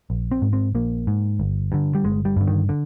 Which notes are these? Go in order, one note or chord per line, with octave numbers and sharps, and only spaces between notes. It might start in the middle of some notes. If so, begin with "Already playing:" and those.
A#1
C4
G#2
C4
A#1 A#3
G#2
G1
G2 D3
G3
G1 G#3
G3
G2 D3
D#3
D3